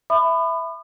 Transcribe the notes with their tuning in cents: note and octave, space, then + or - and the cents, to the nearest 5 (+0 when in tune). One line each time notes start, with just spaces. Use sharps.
E5 +0 B5 +20 D#6 -45